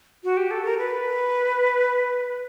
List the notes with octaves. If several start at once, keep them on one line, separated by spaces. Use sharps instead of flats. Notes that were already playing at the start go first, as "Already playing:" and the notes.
F#4
G4
A4
A#4
B4